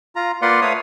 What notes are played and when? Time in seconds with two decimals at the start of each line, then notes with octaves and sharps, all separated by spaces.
0.16 F4 A#5
0.42 A#3 F4 B4 D5 F#5 C6
0.62 A3 B4 C#5 F5 D#6